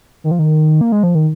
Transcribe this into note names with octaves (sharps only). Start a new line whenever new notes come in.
D#3
F3
D#3
A#3
G#3
F3
D#3